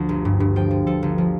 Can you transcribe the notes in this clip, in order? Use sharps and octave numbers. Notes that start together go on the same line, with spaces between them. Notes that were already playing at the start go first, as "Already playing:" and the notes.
Already playing: D2 D3 F3
G1
G2
G2
F3 G5
F3
F3 A4
G1
F3